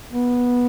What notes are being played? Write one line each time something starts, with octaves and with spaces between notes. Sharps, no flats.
B3